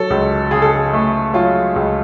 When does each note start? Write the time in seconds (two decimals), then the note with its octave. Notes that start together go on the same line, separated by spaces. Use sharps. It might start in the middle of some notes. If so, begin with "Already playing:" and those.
Already playing: F#3 A4
0.10 C#2
0.51 C#3 G#4
0.62 A4
0.73 G#4
0.93 A3
1.34 F#3 F4
1.76 C#2